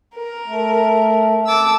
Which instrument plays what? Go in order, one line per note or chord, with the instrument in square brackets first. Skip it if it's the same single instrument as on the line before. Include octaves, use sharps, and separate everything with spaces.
[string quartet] A#4
[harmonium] A3
[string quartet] A5 D6 E6